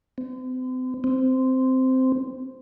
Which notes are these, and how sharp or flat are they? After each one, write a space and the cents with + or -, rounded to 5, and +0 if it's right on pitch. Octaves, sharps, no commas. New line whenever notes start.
C4 -40
C4 -10